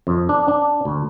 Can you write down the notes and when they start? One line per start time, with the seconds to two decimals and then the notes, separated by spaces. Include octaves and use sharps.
0.07 F2
0.29 D4
0.48 D4
0.85 D2